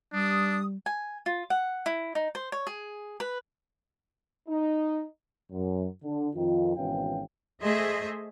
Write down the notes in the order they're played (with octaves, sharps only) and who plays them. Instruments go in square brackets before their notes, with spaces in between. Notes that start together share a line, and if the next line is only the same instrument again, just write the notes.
[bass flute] G3 [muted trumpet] D4 [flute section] D#6
[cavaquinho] G#5
F4
F#5
E4
D#4
C5
C#5
G#4
B4
[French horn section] D#4
[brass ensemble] F#2
D3
F2 D#3 F4
G#1 B2 E3 C#4 F5 G5
[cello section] A3 G#4 C5 D#5 E5